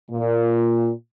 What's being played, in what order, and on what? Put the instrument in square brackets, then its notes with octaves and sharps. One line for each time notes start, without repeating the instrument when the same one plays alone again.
[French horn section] A#2